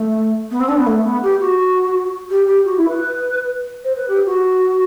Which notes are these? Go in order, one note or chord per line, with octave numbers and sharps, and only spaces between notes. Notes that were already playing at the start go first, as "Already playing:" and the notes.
Already playing: A3
B3
C4
D4
B3
A3
B3
G4
F#4
G4
G4
F#4
E4
B4
C5
B4
G4
F#4